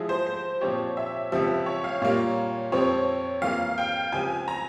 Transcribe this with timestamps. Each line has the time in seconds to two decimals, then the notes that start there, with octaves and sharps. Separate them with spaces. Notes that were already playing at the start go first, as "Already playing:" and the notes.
Already playing: F3 G#3 E4 G#4
0.09 C5
0.27 C5
0.61 A#2 F3 C4 G4 C#5
0.97 E5
1.32 C#2 C3 F3 E5
1.66 C#5
1.84 F5
2.02 A#2 G3 A#3 F4 C#5
2.72 F2 C3 F3 C4 C#5
3.42 F2 E3 A#3 F4 G#4 F5
3.78 G5
4.12 C#2 C3 F3 G#5
4.48 A#5